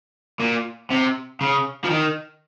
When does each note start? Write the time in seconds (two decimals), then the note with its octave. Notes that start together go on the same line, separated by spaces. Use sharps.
0.40 A#2
0.90 C3
1.41 C#3
1.85 F3
1.90 D#3